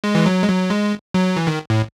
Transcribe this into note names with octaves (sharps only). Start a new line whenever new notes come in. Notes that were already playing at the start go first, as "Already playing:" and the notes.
G#3
E3
F#3
G#3
F#3
G#3
F#3
E3
D#3
A2